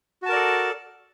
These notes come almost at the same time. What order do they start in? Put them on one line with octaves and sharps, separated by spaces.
F#4 A5 A#4 D5 A4